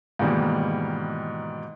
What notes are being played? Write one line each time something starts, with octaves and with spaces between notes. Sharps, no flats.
G#2 B2 D#3 E3 G3 A#3